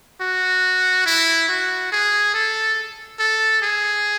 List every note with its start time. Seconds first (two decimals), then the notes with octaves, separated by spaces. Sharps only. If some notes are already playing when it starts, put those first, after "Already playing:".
0.21 F#4
1.06 E4
1.49 F#4
1.92 G#4
2.34 A4
3.20 A4
3.62 G#4